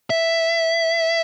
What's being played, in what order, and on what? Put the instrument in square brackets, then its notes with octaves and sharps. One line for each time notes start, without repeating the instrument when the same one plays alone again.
[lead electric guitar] E5